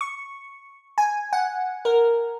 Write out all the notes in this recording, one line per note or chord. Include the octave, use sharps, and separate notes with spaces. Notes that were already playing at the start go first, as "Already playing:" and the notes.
C#6
G#5
F#5
A#4